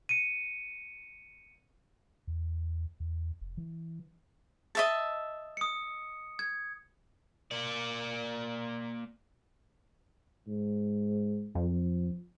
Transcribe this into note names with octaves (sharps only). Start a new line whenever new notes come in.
C#7 D#7
E2
E2
F1
E3
D#5 E5 A5
D#6 C#7
G#6
A#3 D5
G#2
F2 F3